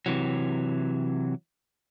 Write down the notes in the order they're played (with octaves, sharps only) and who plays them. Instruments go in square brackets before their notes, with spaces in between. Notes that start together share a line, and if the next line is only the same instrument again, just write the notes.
[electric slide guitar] C3 E3 F#3